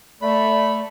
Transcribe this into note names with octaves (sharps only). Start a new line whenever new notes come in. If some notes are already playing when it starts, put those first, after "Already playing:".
A3 D5 B5